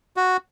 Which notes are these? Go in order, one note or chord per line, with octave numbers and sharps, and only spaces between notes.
F#4